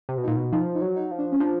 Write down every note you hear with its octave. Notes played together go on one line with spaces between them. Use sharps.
C3
B2
D#4
A#2
B2
F3 D#4
D#4
F#3
D#4
F3
D4
C#4
F3 D4